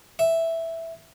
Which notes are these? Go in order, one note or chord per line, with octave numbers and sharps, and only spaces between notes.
E5